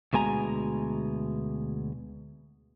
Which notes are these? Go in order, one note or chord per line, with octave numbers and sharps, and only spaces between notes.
D2 B2 G#3 G#5 A#5